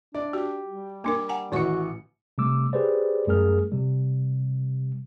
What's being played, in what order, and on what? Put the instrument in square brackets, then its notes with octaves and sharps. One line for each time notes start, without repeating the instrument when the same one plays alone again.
[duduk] D4 [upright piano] D5 [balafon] E5
[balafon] F#4 [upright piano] G4
[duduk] G3
[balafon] A#3 D4 A#4 [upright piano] D6
[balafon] F#5 G#5 A#5
[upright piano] A1 E3 C#7 [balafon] D#3 B4 C#6 [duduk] F#4
[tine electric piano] C3 G3 A3 D6 E6
G4 G#4 B4 C5 D5
F#2 G3 A3 G#4 A#4 F6
C3 G3